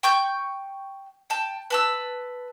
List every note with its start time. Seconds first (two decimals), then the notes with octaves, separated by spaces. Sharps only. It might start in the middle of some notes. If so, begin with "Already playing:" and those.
0.03 G5 C#6 G6
1.30 G5 A5
1.70 B4 A5 E6